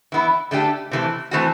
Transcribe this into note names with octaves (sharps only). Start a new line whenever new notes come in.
E3 B3 E4
D3 A3 D4 G4
C3 E3 A3
E3 A3 C4 F#4